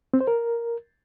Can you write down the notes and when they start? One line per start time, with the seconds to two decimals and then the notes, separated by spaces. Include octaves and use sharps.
0.14 C4
0.21 C5
0.27 A#4